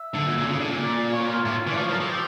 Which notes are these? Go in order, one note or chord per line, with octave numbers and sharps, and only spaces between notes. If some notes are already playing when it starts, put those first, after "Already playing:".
Already playing: E5
D3
A#2
A#2
C#3
D3
A#2
D5
C#5
F4
A2 F4
E3 D5
F3
C#5
F3 A#4
F3 A4
G4